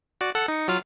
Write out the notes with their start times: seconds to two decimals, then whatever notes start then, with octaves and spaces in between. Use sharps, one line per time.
0.21 F#4 D5
0.35 A4 F#5
0.48 D#4 C#7
0.68 F#3 F4 F5